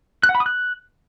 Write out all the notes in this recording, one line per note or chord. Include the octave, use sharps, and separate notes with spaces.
F#6
F#5
B5
D#6
F#6